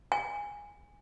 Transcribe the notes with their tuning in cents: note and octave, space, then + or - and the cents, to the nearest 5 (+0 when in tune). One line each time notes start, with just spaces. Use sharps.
G#5 -15